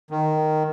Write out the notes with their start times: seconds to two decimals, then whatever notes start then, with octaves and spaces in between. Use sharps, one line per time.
0.11 D#3